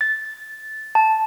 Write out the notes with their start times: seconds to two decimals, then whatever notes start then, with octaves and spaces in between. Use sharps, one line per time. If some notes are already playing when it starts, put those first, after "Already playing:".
0.01 A6
0.95 A5